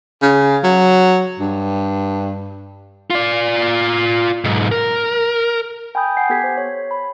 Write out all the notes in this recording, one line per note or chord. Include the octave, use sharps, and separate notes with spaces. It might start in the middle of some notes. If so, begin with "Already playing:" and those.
C#3
F#3
G2
F4 D5
B1 G#2
A#4
G5 G#5 B5 D#6 G6
F#5 G#5 G6 C7
B3 G4 A4 G#6 B6
C5
C#5
B5